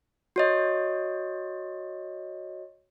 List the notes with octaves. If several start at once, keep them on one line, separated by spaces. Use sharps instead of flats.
F#4 C#5 D#5